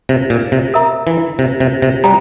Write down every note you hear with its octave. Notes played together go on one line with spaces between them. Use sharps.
C3
A#2
C3
A#4 E5 A#5
E3
C3
C3
C3
G3 C5 G5 A#5